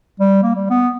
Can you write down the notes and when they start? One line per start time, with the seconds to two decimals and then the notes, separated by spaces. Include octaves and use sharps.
0.20 G3
0.43 A#3
0.56 G3
0.70 B3